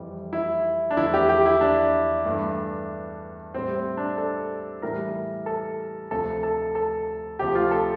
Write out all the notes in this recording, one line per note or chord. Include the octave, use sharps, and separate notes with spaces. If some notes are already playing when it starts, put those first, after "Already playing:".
Already playing: F2 E3 G3
E4
D4
E2 D3 F3 A3 E4
G4
G4
E4
D4
G2 E3 A3
A2 G3 C4
C4
D4
A4
A2 E3 G3 A#4
A4
D2 C3 F3 A3 A4
A4
A4
D2 C3 F3 G4
F4
A4